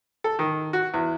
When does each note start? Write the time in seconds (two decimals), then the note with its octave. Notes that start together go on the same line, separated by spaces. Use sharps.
0.24 A4
0.39 D#3
0.73 F#4
0.94 E2